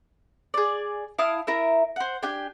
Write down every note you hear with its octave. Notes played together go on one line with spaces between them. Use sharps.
G#4 D5
E4 F5 A5 D#6
E4 A#4 E5
C5 F#5
D4 G4 G5 G#5